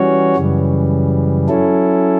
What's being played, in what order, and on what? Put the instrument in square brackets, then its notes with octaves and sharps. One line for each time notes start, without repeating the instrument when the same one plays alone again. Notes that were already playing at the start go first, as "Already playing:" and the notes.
Already playing: [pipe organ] E3 G3 C#4 F#4 C#5
F#2 C#3 E3 G3
F#3 C#4 E4 A4